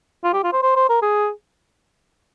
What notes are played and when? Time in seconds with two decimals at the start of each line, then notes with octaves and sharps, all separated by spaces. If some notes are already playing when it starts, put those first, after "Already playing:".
0.24 F4
0.33 G4
0.43 F4
0.53 C5
0.63 C5
0.76 C5
0.89 A#4
1.02 G#4